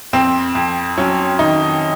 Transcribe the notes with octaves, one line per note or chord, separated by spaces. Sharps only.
F2 C4
F2
F#3 C#4
D#3 D#4